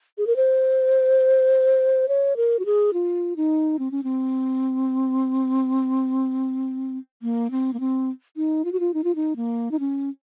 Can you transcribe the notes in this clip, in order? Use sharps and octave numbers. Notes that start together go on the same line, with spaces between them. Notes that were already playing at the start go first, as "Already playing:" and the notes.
G#4
A#4
C5
C#5
A#4
F#4
G#4
F4
D#4
C4
C#4
C4
A#3
C4
A#3
C4
D#4
F4
F#4
F4
D#4
F4
D#4
A#3
D#4
C#4